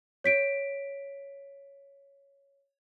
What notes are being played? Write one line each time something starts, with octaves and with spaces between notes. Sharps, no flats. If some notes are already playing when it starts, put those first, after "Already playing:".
C#5 B6 D7